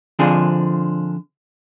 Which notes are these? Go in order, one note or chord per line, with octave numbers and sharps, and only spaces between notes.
D3 F3 C4 D4 G#4